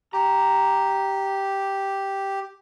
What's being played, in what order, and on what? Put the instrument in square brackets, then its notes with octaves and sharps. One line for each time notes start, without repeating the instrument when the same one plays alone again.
[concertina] G4 [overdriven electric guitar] A#5